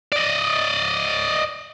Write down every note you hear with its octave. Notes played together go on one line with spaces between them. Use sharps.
D5 D#5